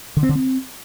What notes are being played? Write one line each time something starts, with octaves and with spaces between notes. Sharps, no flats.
D3
C4
D3
C4